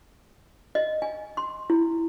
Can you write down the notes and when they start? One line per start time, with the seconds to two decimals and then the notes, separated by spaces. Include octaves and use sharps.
0.75 D#5
1.02 G#5
1.37 C6
1.70 E4